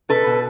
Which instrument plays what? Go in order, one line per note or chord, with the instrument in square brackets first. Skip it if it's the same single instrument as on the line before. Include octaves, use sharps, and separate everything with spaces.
[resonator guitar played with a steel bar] B2 A4 B4
B2